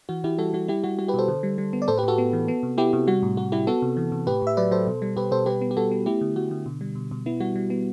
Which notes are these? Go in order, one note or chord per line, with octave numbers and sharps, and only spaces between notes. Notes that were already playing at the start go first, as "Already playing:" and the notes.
E3 F#4
E3 E4 G4
G3 F#4 A4
G3 F#4
G3 E4 G4
G3 F#4
G3 F#4
G4 B4
B2 A4 C5
D3
G3
G3
B3
D5
A2 A4 C5
G4 B4
A2 F#4 A4
B3
E3
B3
C3
B3 E4 G4
C3
G3 F#4
A2
A2 F#4
G3 E4 G4
B3 F#4 A4
C3
E3
C3
A2 G4 B4
A2 E5
F#3 B4 D5
F#3 A4 C5
B2
G3
B2 G4 B4
B2 A4 C5
G3 G4 B4
B3
G4
G3 F#4 A4
B3
A3 E4 G4
D3
D3 F#4
D3
B2
G3
B2
B2
B3 E4
G3 F#4
G3
B3